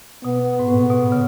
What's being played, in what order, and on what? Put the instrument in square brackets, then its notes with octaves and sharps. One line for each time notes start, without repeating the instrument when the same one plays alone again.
[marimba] B2 [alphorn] B3
[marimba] G#2
[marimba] A2 [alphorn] B3
[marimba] B2
C#3